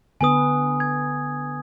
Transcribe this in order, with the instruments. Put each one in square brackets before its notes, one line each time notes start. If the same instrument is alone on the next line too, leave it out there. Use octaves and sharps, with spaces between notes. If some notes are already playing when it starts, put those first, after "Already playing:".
[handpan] D3 B3 B4 [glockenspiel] G#5 D#6
[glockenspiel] G#6